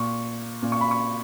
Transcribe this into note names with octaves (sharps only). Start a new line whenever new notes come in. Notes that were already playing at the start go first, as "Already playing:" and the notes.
Already playing: A#2 C#6
A#2
C#6
B5
C#6